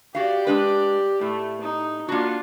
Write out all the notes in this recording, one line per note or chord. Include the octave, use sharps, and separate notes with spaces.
F#4 G4 D5 F5
G#3 D4 B4
A2 A3
D#4
A#3 D4 F4 F#4